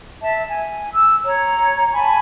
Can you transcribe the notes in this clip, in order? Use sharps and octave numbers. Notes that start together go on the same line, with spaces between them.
E5 A5
G#5
E6
C#5 A#5
G#5 A5 B5 C#6